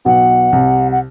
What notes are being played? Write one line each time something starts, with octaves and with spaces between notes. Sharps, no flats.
B1 B2 F#5
C2 C3
F#5